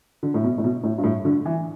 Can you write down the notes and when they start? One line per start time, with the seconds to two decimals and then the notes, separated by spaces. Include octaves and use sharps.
0.23 D3
0.34 A2
0.43 B2
0.58 A2
0.64 B2
0.84 A2
0.98 G2
1.04 A2
1.25 D3
1.45 E3